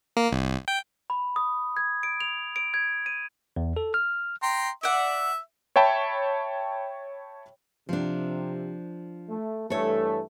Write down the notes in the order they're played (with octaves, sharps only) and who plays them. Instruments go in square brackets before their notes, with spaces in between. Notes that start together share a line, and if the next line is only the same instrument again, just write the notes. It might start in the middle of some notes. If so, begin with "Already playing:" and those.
[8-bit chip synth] A#3
C2
G5
[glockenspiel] B5
D#6
G#6
D7
F7
D7
G#6
D#7
[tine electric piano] E2
A4
F6
[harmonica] G5 A#5 C6
[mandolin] D5 F#5 [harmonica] E5
[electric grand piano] C#5 E5 G5 A5 B5
[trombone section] C3 [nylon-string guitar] F3 D4
[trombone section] A3
[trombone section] G2 E3 A3 [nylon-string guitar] A4 C#5